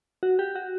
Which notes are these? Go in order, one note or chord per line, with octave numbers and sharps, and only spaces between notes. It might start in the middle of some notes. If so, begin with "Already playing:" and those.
F#4
G4
F#4